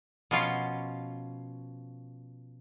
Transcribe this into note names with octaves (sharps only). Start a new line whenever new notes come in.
B2 F3 C#4 F4